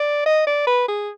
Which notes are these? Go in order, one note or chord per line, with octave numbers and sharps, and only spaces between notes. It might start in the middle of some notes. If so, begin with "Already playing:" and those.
Already playing: D5
D#5
D5
B4
G#4